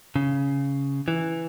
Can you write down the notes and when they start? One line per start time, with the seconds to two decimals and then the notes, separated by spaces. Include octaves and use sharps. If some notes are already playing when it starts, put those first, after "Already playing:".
0.16 C#3
1.08 E3